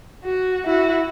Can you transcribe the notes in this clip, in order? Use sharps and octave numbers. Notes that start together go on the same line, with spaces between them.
F#4
E4 F#4